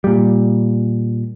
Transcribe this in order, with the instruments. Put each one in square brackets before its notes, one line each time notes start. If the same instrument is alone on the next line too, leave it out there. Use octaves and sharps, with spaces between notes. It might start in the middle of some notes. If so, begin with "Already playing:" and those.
[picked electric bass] A#2 G3